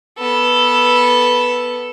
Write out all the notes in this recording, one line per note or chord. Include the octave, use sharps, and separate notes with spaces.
B3 A4